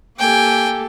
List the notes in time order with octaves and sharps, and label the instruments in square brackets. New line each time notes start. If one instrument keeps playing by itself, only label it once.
[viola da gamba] A#3 G4 A4 [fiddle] G5 G#5